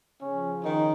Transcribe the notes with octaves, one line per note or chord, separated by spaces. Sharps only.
C#3 F3 C#4
D#3 D#4